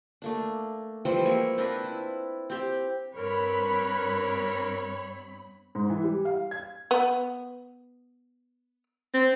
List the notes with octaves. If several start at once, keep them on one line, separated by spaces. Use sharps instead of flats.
A3 A#3 D4
E3 F3 G3 C4
G#3 A#3 E4 C#5
C4 D4 A#4 B4
E4
C4 G4
G2 C4 A#4 B4 C#5 B5
G#2
E3
G3
F5
G#6
B3
C4